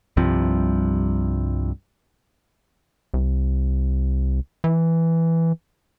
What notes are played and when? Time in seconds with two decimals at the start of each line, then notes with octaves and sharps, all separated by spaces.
0.17 C2 G2 C3 F3
3.14 C2
4.64 E3